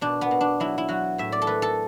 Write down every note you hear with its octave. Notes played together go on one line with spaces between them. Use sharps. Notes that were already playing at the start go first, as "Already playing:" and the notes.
B2 D4
B3
B2
D4
F#3 E4
E4
F#3 F#4
A2 E5
D5
A4
A3 B4
A4